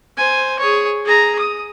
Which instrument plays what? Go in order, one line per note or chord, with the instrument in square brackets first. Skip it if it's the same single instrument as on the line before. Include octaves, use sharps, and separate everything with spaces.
[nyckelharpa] C5 G#5
G#4 C#5
G#4 A#5
D#6